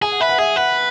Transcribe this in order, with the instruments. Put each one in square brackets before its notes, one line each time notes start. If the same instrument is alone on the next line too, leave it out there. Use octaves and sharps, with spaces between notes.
[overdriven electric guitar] G#4 [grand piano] G#5
[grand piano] F#5
[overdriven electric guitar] B4 [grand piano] E5
[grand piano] F#5
[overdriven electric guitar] G#4 [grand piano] E5
[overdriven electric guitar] B4 [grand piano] F#5